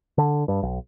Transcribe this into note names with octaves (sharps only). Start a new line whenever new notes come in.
D3
G2
B1